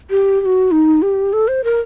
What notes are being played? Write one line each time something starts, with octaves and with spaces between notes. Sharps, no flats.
G4
G4
F#4
D#4
G4
A4
C5
A#4